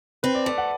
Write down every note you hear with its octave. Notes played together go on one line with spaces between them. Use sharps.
C4 B4
D5
A3 D5
F#5